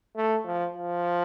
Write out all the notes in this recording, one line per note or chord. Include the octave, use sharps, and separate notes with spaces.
A3
F3
F3